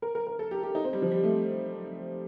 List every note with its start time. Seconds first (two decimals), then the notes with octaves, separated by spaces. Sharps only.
0.02 A#4
0.15 A#4
0.27 A#4
0.39 A4
0.51 G4
0.63 G4
0.75 D#4
0.84 C4
0.93 G3
1.02 F3
1.12 G3
1.24 A3